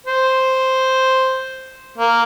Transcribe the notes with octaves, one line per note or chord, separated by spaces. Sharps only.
C5
A#3